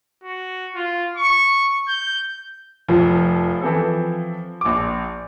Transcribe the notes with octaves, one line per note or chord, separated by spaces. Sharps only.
F#4
F4
C#6
G6
F1 F3
E3 C4 A4
A#1 D6